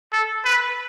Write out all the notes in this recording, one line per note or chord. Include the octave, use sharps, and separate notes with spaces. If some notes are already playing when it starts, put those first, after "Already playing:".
A4
B4